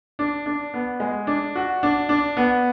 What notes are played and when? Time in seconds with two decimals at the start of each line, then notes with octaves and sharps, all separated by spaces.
0.19 D4
0.46 D4
0.74 B3
1.00 G#3
1.27 D4
1.56 F#4
1.83 D4
2.09 D4
2.37 B3